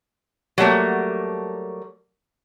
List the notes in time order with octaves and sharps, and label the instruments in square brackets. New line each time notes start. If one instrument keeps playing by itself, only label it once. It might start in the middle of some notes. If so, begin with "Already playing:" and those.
[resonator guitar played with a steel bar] F#3 G3 A3 A#3